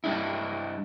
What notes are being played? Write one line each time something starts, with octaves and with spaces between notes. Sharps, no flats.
G2 B2 D4 E4